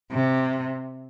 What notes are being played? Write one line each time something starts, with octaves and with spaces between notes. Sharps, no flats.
C3